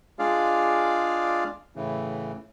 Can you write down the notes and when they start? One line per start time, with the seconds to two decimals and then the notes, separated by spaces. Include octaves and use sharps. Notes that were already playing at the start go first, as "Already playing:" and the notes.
0.19 G#3 D4 F4 G#4 D5 F5
1.76 A2 C#3 E3